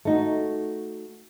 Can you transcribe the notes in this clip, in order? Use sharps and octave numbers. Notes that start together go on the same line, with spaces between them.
A3 D#4 F#4